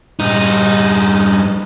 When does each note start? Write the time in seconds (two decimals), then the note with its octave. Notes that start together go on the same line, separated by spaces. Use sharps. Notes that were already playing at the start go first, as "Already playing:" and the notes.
0.20 G2 D#4